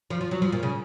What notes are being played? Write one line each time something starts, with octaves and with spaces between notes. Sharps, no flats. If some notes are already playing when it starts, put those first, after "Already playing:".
F3
F3
F#3
F3
A#2
C#3